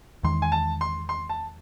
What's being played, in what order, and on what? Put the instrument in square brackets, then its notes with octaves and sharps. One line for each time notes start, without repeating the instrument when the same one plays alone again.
[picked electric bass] E2 D#3 G#3 [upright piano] C6
[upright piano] G#5
A5
C6
C6
A5